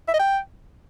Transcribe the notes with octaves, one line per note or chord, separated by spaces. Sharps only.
E5
D#5
G5